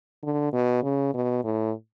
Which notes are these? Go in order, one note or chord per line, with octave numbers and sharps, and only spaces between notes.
D3
B2
C#3
B2
A2